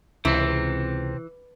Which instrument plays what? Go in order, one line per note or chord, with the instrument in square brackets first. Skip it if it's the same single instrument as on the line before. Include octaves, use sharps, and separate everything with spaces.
[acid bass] C#2 [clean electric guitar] C3 C4 [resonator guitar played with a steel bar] E3